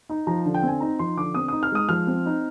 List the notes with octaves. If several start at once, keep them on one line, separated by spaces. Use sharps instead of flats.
D#4
F3 A#5
D3
G5
C4 G#5
D#4 A#5
F3 C6
D3 D6
C4 D#6
D#4 D#6
F6
G#3 D#6
F3 F6
C4
D#4